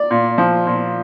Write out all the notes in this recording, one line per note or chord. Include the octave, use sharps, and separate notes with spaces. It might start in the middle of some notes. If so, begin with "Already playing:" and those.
Already playing: D5
A#2
F3
A#2